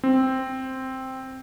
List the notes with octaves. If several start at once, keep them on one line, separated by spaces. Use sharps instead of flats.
C4